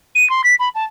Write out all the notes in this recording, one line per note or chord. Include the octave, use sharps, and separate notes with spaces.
D#7
C6
B6
B5
A5